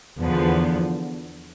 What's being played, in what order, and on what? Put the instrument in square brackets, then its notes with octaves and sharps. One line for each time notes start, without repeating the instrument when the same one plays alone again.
[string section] E2 D3 F3 B3